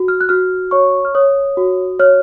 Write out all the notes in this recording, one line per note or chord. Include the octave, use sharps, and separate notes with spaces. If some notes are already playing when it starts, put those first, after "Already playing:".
Already playing: F#4
F6
F#6
F#4 F6
C#5 C#6
F6
C#5 D#6
F#4
C#5 F6